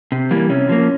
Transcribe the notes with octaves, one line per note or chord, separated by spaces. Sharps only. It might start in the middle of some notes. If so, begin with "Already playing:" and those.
C3
E3 G3 A#3
C3 C#4
F3 A#3